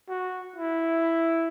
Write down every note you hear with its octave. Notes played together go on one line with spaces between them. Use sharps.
F#4
E4